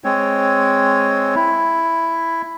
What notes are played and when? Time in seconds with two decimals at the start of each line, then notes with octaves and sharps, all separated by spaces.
0.04 G#3 C4 C#5
1.35 E4